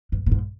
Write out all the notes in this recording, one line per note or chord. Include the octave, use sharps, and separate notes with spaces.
G2
A#2
G#2